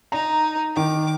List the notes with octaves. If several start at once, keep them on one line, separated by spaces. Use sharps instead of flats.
D#4 A#5
D#3 D6